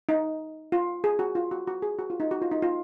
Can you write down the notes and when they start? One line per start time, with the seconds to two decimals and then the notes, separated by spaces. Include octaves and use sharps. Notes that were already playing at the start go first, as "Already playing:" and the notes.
0.09 D#4
0.72 F4
1.04 G#4
1.19 F#4
1.35 F4
1.51 F#4
1.67 F#4
1.82 G#4
1.99 F#4
2.10 F4
2.20 D#4
2.31 F#4
2.42 F4
2.51 D#4
2.62 F4